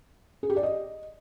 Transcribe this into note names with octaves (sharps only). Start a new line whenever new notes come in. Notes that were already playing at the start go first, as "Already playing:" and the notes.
G#4
G4
D5
D#5